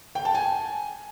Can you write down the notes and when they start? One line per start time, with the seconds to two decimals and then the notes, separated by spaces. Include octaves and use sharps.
0.15 G5
0.25 A5
0.35 G#5